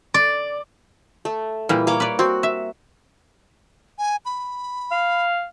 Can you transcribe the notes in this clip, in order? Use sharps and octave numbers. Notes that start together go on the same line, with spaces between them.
D5
A3
A#2 E3 G3
A#3 C#5 D6
B4 D5
C4 F#4
E5
G#5
B5
F5